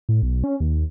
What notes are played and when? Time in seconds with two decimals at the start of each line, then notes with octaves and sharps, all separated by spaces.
0.09 A2
0.23 B1
0.44 C#4
0.60 D#2